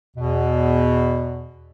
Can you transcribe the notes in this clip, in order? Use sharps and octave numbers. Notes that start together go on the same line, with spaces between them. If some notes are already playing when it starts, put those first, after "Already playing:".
E2 B2